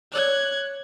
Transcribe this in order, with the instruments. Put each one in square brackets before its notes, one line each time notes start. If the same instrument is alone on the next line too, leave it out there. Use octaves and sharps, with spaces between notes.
[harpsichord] C#5 D5 A5 [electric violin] F#6 G#6